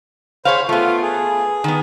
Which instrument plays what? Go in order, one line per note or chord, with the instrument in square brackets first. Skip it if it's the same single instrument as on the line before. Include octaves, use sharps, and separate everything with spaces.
[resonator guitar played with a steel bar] G#4 C#5 F5 [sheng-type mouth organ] C5 B5
[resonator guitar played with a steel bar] A3 B3 [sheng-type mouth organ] F4
[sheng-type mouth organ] G#4
[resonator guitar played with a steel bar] D#3 B3